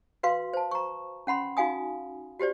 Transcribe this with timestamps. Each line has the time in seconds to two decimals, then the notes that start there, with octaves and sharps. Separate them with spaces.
0.23 F#4 B4 F5 C6
0.54 C5 A5
0.71 A#5 C#6
1.27 C#4 F#5 B5 C6
1.57 D#4 F#4 F5 G#5 D#6
2.39 F#4 G4 C5 D5